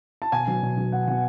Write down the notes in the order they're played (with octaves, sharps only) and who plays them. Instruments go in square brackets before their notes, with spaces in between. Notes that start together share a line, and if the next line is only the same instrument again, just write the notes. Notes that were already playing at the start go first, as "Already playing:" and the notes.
[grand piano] A5
B2 G#5
F#3 B3
B2
F#3 B3
B2 F#5
F#3 B3 F#5